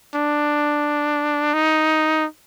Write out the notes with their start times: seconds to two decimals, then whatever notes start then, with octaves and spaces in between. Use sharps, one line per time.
0.15 D4
1.53 D#4